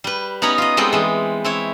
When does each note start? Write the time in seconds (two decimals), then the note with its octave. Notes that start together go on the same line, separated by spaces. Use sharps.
0.04 G3 B4
0.42 B3 C#4 D#4 C#5 A#5 B5
0.58 F4 D#5
0.77 G3 G#3 B3 C4 G4 A4
0.92 E3 G#3
1.44 C4 E4 C#5